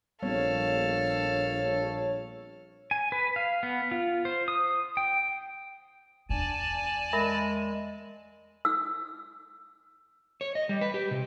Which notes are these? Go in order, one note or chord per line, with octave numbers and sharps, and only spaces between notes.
A#1 G3 B3 C4 A4 C#5 F5
G#5
B4
F5
B3
F4
C5
D#6
G5
E2 D4 D5 G#5 A5
G#3 A#4 E5 B5
E6
C#5
D#5
G3
B4
G4
C3